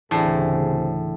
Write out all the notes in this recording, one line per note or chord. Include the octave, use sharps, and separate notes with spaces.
D2 A2 C#3 E3 C4 D4 G4 G#4